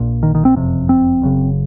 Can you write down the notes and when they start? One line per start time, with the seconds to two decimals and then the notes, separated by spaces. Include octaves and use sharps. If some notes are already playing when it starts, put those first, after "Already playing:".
Already playing: A#1 A#2
0.23 D#3
0.35 D#3
0.45 C4
0.56 F#1 F2 C3
0.89 C4
1.22 F#1 F#2 C#3